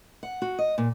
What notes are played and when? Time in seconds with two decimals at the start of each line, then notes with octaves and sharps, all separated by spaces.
0.23 F#5
0.42 F#4
0.59 D#5
0.78 A#2